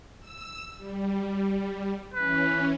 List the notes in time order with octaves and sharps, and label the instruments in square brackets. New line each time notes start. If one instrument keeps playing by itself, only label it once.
[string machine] E6
G3
[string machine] E3 C#4 [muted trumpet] B4